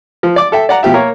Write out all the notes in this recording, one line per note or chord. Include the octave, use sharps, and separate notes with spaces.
F3
D5 D6
A4 E5 G5
D5 F#5 A#5
B2 F3 G4 E5
A#3 A#4 C#5